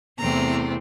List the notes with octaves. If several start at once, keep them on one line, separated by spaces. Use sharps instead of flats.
E2 C3 E3 A3 C4 A#5